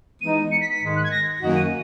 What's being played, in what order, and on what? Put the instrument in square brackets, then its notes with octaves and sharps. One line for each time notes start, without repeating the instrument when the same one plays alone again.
[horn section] E3 G#3 B3 D#4 [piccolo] D#7
[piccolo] C#7
B6
B6
[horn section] G#2 D#3 G#3
[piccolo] F#6
G#6
A#6
[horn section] F#2 D#3 A#3 D#4 F#4
[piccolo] D#7